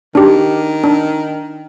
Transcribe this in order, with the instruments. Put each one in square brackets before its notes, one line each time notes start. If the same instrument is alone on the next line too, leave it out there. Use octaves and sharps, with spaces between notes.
[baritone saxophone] D#3 [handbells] D4 G4
[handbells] D4